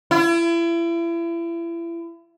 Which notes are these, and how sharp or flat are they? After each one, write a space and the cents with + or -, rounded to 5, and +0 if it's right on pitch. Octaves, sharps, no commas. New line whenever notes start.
E4 +35